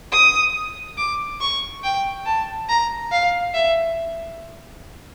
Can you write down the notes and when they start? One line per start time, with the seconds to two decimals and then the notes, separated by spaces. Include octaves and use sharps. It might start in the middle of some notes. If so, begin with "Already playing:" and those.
0.12 D#6
0.98 D6
1.41 C#6
1.84 G5
2.26 A5
2.69 A#5
3.12 F5
3.54 E5